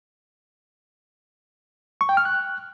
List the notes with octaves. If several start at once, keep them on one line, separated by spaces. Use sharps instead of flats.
C#6
G5
F6
F#6